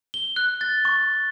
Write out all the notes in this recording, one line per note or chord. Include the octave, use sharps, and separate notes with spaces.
G7
F#6
A6
C#6